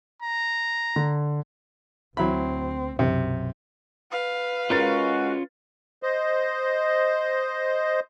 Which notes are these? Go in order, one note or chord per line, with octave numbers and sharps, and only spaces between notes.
A#5
D3
D2 F#3 C4 E4 B5
B1 F#2 C3
B4 F5
G#3 C#4 F4 F#4 A#4 A6
C5 D#5